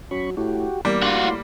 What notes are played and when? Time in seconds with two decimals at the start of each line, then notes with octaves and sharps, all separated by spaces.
0.11 F#3 C#4 B5 C#6
0.37 A2 F#4 G4
0.85 E2 G3 A#3
1.02 D2 F4 F#4 C6
1.23 A2